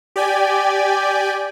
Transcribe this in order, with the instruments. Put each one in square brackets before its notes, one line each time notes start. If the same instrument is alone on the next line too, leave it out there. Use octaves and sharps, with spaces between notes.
[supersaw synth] G4 D5 G5 G#5